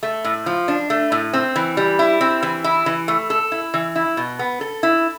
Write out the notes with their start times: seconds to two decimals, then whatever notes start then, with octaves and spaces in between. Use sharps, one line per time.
0.03 A3
0.24 A2
0.46 F3
0.68 D4
0.90 A3
1.12 A2
1.33 C4
1.56 E3
1.77 G3
1.99 E4
2.21 C4
2.43 E3
2.64 E4
2.86 E3
3.08 A3
3.30 A4
3.52 E4
3.74 E3
3.95 E4
4.17 B2
4.39 B3
4.61 A4
4.83 E4